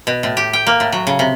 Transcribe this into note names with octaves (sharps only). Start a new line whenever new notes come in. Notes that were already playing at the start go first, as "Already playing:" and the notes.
B2
A2
G4
G5
A#3
A2
F#3
C#3
C3